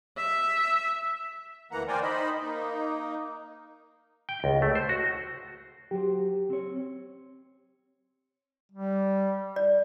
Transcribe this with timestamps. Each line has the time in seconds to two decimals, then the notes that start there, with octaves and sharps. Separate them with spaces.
0.17 E5
1.71 D2 E3 A#3 F#5 A#5
1.88 A#4 C5 D5 G5 G#5
2.02 D#4 C5 D#5 B5
2.41 A#3 D#4
4.29 G5
4.44 C#2
4.62 A3
4.75 C5
4.89 F#4
5.91 F#3 F#4 G4 C5
6.50 C4 C#5
8.72 G3
9.56 D5